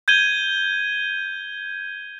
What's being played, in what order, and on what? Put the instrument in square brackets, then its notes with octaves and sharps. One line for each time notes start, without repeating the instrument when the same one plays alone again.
[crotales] G6 G#6 D#7 G7